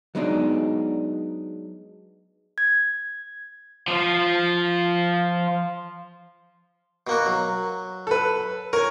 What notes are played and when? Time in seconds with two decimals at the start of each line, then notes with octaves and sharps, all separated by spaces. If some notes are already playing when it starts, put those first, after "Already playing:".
0.15 F#3 G#3 B3 D4 D#4
2.58 G#6
3.88 F3 F4
7.07 B2 A#3 F#4
7.26 F#3
8.07 A4 B4
8.73 A#4 C#5 G#5